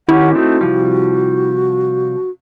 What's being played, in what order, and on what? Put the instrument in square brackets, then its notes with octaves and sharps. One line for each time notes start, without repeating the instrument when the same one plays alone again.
[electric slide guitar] D#3 C#4 G4 [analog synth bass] E4 [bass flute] F#5
[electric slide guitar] A3 C4 D#4 [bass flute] F#4
[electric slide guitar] C3 F3 G3